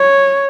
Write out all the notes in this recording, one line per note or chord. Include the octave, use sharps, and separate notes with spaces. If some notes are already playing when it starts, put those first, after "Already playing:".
Already playing: C#5